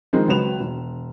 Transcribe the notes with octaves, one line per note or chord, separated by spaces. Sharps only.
D#3 F3 G#3 C4 D#4
C#2 F#3 C4 B4 E7 F7
E1